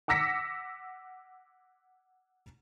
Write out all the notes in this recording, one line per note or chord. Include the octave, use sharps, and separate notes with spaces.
F#5 D6 E6 A#6 B6 C#7